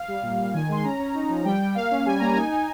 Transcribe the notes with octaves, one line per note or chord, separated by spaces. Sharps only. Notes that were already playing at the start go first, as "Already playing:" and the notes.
Already playing: F5
G3
A#2
A#2
D#3 G#5
G#3 C6
C#4 A#5
C#4
D#4
F3
G3 G5
G3
A#3 F5
C#4
G3 G#5
A#3 A#5
D#4 G#5
D#4